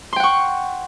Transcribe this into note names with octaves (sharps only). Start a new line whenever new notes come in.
F#5 G5 C6 C#6